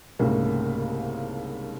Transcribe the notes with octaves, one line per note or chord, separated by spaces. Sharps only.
C2 G#2 C#3 A3 A#3